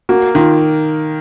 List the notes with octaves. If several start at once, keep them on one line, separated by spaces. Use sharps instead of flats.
A#3 F#4
D#3 F4